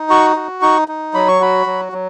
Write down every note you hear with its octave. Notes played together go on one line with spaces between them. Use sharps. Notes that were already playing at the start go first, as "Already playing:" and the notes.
Already playing: D#4
F#4 C#6
F#4
D#4 C#6
D#4
F#3 B5
C#6
F#4 B5
F#3
F#3